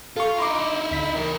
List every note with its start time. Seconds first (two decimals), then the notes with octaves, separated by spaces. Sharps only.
0.16 F4 A4 C#6
0.38 D#4 E4 A#5 C6 D6
0.91 D2 B6
1.15 E3 A#4